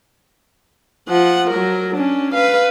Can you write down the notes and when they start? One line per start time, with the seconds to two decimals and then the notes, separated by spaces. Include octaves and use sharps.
1.09 F3 F#5
1.50 F#3 A#4
1.95 C#4 D4
2.34 B4 F5